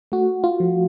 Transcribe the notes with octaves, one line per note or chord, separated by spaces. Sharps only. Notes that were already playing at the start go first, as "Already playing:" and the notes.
A3 F#4
F4
F3